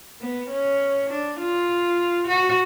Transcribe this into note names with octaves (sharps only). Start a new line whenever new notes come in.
B3
C#4
D4
F4
F#4